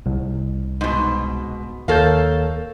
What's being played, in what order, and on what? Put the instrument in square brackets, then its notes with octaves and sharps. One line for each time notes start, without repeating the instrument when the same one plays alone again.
[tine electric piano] C2
[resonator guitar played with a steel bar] G#2 B2
[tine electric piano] D#2 C#5 G6 [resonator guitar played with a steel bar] A4 A#4 F5